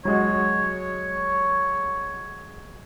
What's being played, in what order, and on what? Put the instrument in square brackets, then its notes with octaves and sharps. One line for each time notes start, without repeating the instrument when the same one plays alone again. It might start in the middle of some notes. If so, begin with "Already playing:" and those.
[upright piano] F#3 G#3 F#4 [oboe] C#5